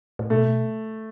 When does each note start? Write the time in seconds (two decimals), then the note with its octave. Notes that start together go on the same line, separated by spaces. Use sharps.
0.19 A2
0.30 B2 A3